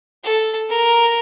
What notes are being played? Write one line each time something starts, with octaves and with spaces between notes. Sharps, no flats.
A4
A#4